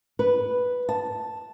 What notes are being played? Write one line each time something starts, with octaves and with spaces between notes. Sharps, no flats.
B4
A5